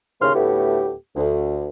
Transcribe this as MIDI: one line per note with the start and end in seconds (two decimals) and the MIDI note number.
0.21 0.34 39
0.21 0.34 45
0.21 0.34 49
0.21 0.34 84
0.21 0.34 89
0.34 0.93 38
0.34 0.93 45
0.34 0.93 57
0.34 0.93 59
0.34 0.93 67
1.16 1.67 38